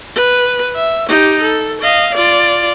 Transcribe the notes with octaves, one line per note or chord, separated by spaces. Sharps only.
B4
E5
D#4 G4
A4
D#5 F5
F4 D5